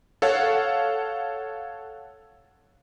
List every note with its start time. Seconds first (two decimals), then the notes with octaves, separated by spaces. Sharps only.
0.22 A4 C#5 F5 F#5